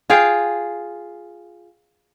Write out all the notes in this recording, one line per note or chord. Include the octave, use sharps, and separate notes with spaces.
F4 G#4 F5 G5